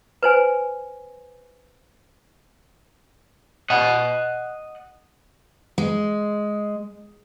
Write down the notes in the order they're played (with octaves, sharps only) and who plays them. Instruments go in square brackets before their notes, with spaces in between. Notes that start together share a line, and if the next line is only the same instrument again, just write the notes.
[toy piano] B4 C5 G#5
[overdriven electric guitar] D#5 F#5
[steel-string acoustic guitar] G#3